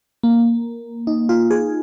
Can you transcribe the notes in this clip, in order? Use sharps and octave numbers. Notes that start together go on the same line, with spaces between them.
A#3
D#4
F4
G#4